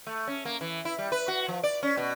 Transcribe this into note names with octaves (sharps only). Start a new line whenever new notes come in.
A3
C#4
A#3
E3
E4
G3
B4
F#4
F3
D5
C#4
B2